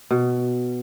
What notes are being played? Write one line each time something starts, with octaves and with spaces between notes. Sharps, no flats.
B2